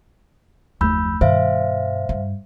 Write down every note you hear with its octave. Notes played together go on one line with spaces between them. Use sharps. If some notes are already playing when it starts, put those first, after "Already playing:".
F#1 D#2 F3 A3 B5 E6 G6
G2 B2 D#3 C5 E5 F5
G2